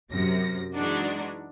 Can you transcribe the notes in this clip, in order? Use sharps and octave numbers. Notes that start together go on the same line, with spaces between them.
F#2 C3 A#6
E3 G#3 D4 D#4 F#4